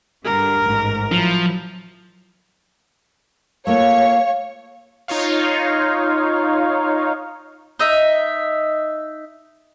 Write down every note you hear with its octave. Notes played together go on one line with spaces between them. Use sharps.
G2 D3 G3 A#4
A1 G#2
F3 F#3 E4
A3 A#3 F4 C#5 F5
D#4 F4 C#5 F5
D#4 D#5 E5